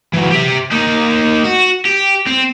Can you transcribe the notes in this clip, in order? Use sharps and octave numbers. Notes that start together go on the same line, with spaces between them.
E3 F#3
G4 E5
A#3 D#4
F#4
G4
C4